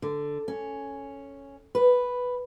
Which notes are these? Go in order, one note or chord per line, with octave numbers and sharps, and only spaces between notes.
D3
C#4
B4